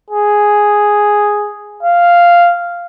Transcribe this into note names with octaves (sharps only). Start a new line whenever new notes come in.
G#4
F5